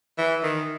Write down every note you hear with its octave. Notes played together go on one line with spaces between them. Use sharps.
E3
D#3